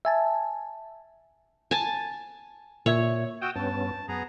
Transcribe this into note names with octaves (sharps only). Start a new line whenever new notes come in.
E5 G#5 A5
G#5 A5
A#2 C#5 E5 G#6
F#4 G5 D#6 E6
G2 B3 C#4 A5
F#2 B3 G#4 A#5